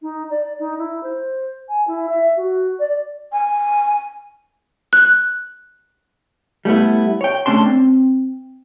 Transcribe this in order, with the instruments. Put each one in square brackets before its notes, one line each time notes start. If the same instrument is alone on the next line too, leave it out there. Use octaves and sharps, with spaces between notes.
[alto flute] D#4
D5
D#4
E4
C5
G#5
E4
E5
F#4
D5
[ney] G#5
[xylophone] F#6
[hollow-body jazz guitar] G3 A3 B3 E4
C#5 G5
A3 C#4 D4 A5 C6
C4